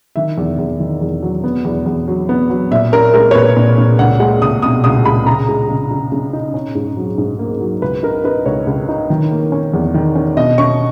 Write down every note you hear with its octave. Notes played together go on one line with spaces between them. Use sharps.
D#3 E5
E2
E2
D#3
E2
F#3
B3
E2
E2
F#3
B3
F#3
A#2 E5
C#4 A#4
G#3 A#4
C#5
A#2 B4
A#2
A#2
C#2 F#5
G#3 F#5
C#2 D#6
B2 D#6
C#2 D#6
C#2 B5
C#3 A#5
G#3
C#3
C#3
C#3
D#4
C#4
G#2
F#3
G#2
A#3
F#3
C#2 B4
D#4 A#4
D#4 B4
C#2 C#5
C#2
D#4
D#3
A#3
C#4
E2
D#3
C#4
B2 D#5
C#4 C#6